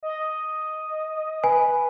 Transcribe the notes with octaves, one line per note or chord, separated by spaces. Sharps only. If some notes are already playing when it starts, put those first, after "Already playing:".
D#5
B4 G#5